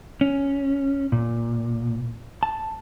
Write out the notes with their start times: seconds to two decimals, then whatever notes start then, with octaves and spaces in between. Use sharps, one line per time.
0.21 C#4
1.12 A#2
2.43 A5